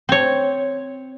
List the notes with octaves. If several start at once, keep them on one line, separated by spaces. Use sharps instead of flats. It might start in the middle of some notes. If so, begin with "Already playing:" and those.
C4 C#5